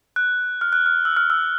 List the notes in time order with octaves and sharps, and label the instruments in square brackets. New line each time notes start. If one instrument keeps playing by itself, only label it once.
[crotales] F#6
F6
F#6
F6
E6
F6
E6